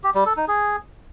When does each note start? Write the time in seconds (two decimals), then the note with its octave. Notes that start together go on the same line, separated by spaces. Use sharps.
0.04 G4
0.15 G3
0.26 A4
0.37 D#4
0.48 G#4